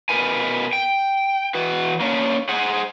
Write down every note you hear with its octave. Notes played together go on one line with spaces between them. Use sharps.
B2 D#3 A#4 B4 G#5
G5
E3 F#4 B4
A#3 C#4 D4
G#4 C5 F#5